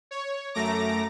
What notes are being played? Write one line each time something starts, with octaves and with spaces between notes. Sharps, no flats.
C#5
F#2 A3 A#5 D6 A#6